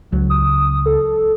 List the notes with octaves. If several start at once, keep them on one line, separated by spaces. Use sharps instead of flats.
C#2 F#3
D#6
A4